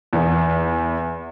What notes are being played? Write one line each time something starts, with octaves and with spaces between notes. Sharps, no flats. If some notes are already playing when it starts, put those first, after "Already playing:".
E2